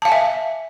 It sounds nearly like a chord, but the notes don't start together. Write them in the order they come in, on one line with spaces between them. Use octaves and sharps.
A5 F5 G#5 E5